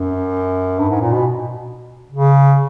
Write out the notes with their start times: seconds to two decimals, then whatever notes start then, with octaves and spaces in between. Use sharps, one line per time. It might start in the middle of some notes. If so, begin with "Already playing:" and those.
Already playing: F#2
0.79 G2
0.89 G#2
1.01 A#2
1.13 B2
2.12 C#3